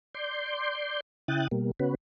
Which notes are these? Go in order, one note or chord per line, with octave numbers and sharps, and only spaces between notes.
D5 C6 G6
C#3 E4 G5 D#6 F#6 A6
B2 G3 A#3
C#3 B3 C#4 F#4 B4